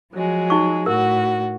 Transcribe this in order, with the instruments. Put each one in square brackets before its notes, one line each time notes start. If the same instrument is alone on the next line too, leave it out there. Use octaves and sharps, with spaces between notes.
[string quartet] F3 F#3 G#3
[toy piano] D#4 C#6
[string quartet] A2 F#4 [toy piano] A#4